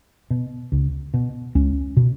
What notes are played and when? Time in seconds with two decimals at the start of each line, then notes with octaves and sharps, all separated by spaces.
0.30 B2
0.72 C#2
1.14 B2
1.55 C#2 C#4
1.97 B2